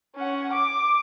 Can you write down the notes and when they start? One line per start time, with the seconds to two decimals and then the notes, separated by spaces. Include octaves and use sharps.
0.16 C#4 F#5
0.52 D6